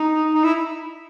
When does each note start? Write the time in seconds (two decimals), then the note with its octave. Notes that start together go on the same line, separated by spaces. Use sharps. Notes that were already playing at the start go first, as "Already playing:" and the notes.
Already playing: D#4
0.34 D#4
0.44 E4